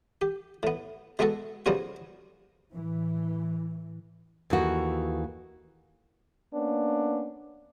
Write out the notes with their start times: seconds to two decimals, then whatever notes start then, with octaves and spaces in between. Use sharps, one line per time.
0.22 G4
0.63 A2 B3
1.19 B2 G#3 B3 F#4 A4
1.66 C#3 F3 G3 B3 C4 F#4
2.73 A2 E3
4.50 D#2 E3 A3 F#4
6.54 A#3 B3 C#4 D4